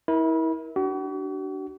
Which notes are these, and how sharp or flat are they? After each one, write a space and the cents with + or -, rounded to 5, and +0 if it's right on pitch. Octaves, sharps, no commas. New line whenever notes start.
E4 -30 A#4 +25
D4 +0 F#4 +40